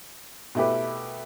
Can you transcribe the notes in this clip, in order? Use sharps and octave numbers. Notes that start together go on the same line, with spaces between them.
B2 A3 E4 G4 B4